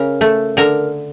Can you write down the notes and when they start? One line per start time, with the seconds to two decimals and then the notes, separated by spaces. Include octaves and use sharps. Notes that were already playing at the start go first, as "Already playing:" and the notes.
Already playing: C#3 A#4
0.21 A3
0.57 D3 A#4